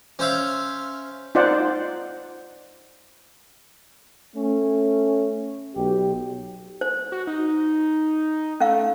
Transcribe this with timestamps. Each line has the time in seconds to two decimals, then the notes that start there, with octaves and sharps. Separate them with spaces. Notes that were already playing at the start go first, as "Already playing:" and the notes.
0.19 C#4 C5 E5 F5
1.35 D#4 F4 C5 D5 F#5
4.35 A3 C#4
5.76 B1 G4
6.81 C5
7.12 F#4
7.27 D#4
8.60 A3 C#4 F5